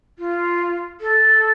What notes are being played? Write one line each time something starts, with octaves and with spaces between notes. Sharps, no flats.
F4
A4